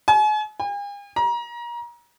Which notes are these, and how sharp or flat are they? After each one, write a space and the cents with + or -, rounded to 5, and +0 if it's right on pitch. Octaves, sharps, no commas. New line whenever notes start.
G#5 +40
G#5 -45
A#5 +30